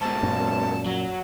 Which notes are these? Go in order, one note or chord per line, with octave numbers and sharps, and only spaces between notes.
G#2 B2 A5
F#2 A#2
F#3